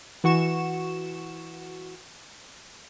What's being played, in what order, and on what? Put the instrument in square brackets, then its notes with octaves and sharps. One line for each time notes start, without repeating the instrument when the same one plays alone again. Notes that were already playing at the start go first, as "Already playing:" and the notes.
[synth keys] E3 F#4 C#6 E7